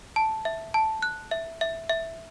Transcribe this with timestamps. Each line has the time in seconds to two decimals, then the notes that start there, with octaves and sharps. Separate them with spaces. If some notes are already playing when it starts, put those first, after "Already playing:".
0.16 A5
0.45 E5
0.74 A5
1.02 F#6
1.31 E5
1.61 E5
1.90 E5